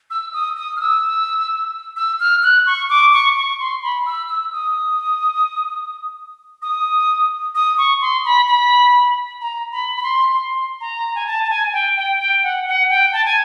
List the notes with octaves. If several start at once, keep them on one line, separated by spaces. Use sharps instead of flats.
E6
D#6
D#6
F6
E6
E6
F6
F#6
C#6
D6
C#6
C#6
C6
B5
E6
E6
D#6
D#6
D#6
C#6
C6
B5
B5
A#5
B5
B5
C6
C6
A#5
G#5
A5
A5
G#5
G5
G5
G5
F#5
F#5
G5
A5
G#5